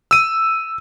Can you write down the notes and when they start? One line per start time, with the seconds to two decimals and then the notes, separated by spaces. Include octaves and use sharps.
0.11 E6 D#7